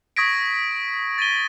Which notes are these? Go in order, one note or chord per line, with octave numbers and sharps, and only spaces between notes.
C#6 D#6 G#6 A#6 B6 D7
A6 D#7 G7